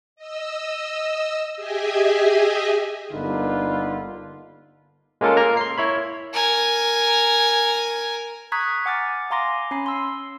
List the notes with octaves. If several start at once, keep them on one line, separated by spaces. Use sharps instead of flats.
D#5 E6
G4 G#4 D#5 E5 G#5
G1 D3 A#3 D#4 F4 B4
G#3 A#3 C#4 F4 A4 A#4
A#3 A#4 A#5
C6 C7
E4 C#5 B5
A#4 G#5
A#5 C#6 D#6 F#6 G#6 B6
F#5 G#5 D6 F6 A6
F5 G#5 A#5 C6 D6 A#6
C#4 G#5 B5 C7
C6 E6